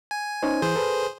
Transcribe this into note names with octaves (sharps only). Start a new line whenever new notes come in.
G#5
C#4 D#4 C5
E3 G#4 C5 G6
A4 B4